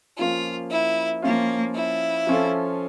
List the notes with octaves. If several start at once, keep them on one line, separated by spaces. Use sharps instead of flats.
F3 A#3 C#4 F4
E4
F3 A#3 C#4 F4
E4
F3 C#4 F4 A4